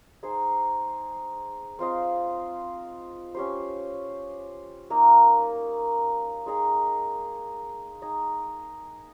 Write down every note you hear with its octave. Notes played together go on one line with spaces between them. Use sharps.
D#4 G#4 C5
C4 F4 C5 D#5
C#4 G4 C5
A#3 D#4 A#4
G#3 D#4 G#4 D#5
D#4 G#4 D#5